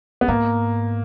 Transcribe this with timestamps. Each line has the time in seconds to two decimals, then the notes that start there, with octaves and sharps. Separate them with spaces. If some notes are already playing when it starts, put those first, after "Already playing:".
0.21 B3
0.28 G#2 A#3